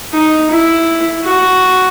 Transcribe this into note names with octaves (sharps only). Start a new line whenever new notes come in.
D#4
E4
F#4